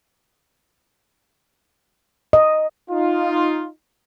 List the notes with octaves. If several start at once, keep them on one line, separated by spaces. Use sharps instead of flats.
D#5
D#4 F4